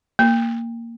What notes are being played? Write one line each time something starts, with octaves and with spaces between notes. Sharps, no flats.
A#3